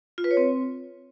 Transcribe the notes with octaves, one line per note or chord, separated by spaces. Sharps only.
F4
B4
C#5
C4